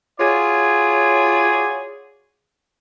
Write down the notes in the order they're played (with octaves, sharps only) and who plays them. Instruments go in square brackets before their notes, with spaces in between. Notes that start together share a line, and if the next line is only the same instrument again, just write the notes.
[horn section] F4 F#4 G#4 C#5 D5